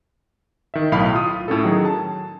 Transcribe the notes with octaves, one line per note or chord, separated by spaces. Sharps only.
D#3 E5
B1 A2 F5 B5 D#6
F4 D#6
A2 C#4 A4
D#3 F#3 C#4 G#4
A5